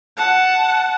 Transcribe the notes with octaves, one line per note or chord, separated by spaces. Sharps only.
F#5 A5